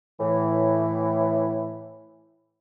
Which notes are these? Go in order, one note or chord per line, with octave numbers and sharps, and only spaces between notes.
A2 E3